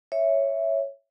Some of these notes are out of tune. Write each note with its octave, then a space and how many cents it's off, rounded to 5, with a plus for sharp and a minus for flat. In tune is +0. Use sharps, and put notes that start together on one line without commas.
C#5 +0 E5 +0